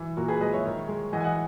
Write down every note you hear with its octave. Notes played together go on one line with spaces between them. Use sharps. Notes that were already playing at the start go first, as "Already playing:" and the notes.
Already playing: E3
A#2 F#4 A#4
G#4 B4
G#3 B4 D#5
C#5 E5
D#3
G#3
E3 D#5 F#5
G#5
D#5 F#5